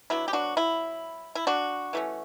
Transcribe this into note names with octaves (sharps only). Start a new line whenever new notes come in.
F#3 B3 D4 E4
G4
D4 F#4
E4
E4
D4 F#4
E3 A3 C#4